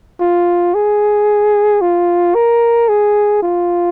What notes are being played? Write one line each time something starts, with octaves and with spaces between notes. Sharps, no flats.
F4
G#4
F4
A#4
G#4
F4